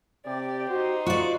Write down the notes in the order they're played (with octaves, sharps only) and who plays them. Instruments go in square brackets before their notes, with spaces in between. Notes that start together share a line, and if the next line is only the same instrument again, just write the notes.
[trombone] C3 [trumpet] G4 [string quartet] D5
[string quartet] D#4 C5 [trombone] F#4
[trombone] F4 [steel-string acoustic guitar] F#4 D5 [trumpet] C#6